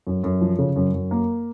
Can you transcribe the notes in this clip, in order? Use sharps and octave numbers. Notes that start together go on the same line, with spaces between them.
F#2
F#2
F3
C#3
F#2
F#2
A#3